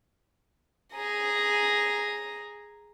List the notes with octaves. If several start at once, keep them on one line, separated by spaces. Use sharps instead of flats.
G#4 A#5